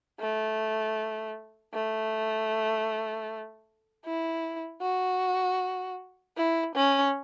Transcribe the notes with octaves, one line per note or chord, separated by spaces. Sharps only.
A3
A3
E4
F#4
E4
C#4